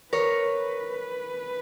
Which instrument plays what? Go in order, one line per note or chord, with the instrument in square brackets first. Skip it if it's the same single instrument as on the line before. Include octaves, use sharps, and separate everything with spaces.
[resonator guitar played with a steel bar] A#4 C#5 [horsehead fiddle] B4